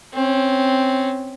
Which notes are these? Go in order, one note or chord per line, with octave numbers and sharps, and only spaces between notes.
C4 C#4